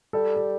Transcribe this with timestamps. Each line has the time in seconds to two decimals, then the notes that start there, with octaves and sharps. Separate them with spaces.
0.13 G3 A4
0.36 A4